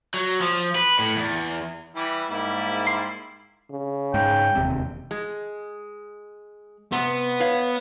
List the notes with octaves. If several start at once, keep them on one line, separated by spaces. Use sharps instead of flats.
F#3
F3
B4
A2
E2
E3 G3 E4
G#2 G3 A#3 E4
C6
C#3
G#2 G5
E1 D#2 C3
G#3
C3 B3
B4 C#5 F5